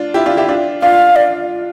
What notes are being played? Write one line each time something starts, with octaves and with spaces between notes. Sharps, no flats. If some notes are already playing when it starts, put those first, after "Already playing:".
Already playing: D4 F4
E4 G4
D4 F4
E4 G4
D4 F4
D4 F4 F5
D5